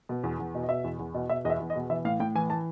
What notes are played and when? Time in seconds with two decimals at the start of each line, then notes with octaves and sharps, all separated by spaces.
0.09 B2
0.24 E2
0.39 E2
0.55 B2
0.63 D#5
0.69 B2 E5
0.84 E2
0.99 E2
1.14 B2
1.29 B2 E5
1.45 E2 D#5
1.50 E5
1.60 E2
1.70 D#5
1.75 B2
1.90 E3 E5
2.05 A2 F5
2.20 A2 G5
2.35 E3 G#5
2.50 E3 A5